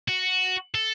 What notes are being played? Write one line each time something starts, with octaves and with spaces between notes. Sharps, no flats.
F#4
A4